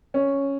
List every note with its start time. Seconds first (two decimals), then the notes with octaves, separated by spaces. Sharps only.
0.14 C#4